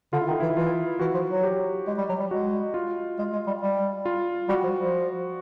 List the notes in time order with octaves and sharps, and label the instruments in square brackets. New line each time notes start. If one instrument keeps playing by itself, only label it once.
[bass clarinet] D3 [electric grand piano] F4
[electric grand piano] E4
[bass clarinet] D#3
[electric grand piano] D#4
[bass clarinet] E3 [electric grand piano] E4
[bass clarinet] E3 [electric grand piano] F4
[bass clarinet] E3 [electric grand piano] F#4
[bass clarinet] F3
F#3
[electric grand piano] G4
[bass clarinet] G#3
G3
F#3
G3
[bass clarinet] G#3 [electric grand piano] F#4
[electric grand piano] F4
[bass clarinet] G#3
G#3
G3
G3
[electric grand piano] F4
[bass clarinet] G3 [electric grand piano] F#4
[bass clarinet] F3
F3